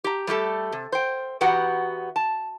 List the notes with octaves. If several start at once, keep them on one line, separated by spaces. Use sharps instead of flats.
G4 A#5
G3 A3 G4 A4
C3
C5 G5
E2 B3 F#4 G4 F#5 A#5
A5